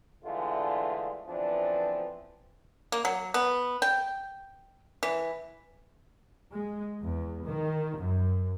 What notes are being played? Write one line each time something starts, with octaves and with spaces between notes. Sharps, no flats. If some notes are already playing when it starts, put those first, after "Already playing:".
G2 D3 E3 G#3 A3 F4
D3 E3 F3 B3 C4 D4
A#3
F#3
B3
G5
E3
G#3
E2
D#3
F#2